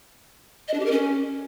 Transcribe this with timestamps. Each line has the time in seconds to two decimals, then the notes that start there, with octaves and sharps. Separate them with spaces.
0.68 D#5
0.74 D4
0.80 G4
0.85 A#4
0.91 C#4